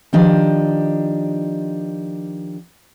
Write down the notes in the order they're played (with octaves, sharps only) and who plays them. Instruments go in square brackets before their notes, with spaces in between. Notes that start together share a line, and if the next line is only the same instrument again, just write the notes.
[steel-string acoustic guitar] D#3 F3 D4 G4 D#5